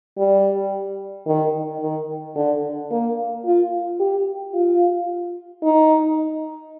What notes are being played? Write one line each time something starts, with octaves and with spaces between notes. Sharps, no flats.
G3
D#3
D#3
D3
A#3
F4
G4
F4
D#4